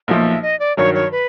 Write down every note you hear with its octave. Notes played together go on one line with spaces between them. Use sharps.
B1 A#2 F3 E5 F#5
D#5
D5
G2 D#3 F#3 C#5
C#5
B4